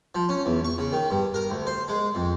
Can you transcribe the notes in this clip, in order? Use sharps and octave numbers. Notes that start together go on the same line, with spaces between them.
F3
C#4
E2
C#6
C#3
D#3
G2
A#4
D2
C5
G#3
F2